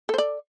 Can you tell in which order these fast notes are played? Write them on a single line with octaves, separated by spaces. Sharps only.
A4 C5 D5